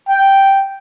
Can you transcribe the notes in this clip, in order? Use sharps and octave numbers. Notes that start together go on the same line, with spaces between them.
G5